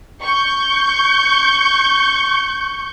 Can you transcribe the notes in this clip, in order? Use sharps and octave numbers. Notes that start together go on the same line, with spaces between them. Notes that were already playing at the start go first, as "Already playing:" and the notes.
C#6 G6